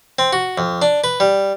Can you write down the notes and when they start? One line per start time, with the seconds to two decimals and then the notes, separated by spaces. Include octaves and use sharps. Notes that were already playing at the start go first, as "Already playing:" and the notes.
0.19 C4
0.33 F#4
0.58 F2
0.82 D4
1.04 B4
1.20 G3